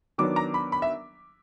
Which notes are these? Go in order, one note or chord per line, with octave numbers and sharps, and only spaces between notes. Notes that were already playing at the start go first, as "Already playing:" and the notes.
D#3 F#3 B3 D4 D6
A#5
B5
B5
E5